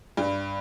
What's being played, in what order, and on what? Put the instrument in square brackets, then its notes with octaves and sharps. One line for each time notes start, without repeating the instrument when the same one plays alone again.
[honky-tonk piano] G2